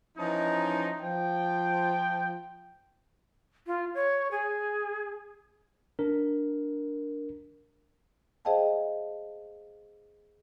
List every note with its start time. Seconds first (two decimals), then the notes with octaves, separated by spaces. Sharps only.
0.18 E3 F3 C#4 D#4
1.01 F3 G5
3.67 F4
3.95 C#5
4.31 G#4
5.99 D4 A#4
8.45 G#4 C5 D#5 F5 G5 A5